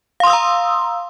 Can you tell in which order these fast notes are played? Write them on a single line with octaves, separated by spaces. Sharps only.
F5 C6 D#6 E6 A#5